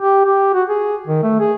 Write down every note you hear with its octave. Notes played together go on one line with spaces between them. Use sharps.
G4
G4
F#4
G#4
D#3
A3
G#4